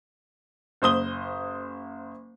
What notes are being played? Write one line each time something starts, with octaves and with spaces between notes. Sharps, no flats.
F#1 C5 D#6 G7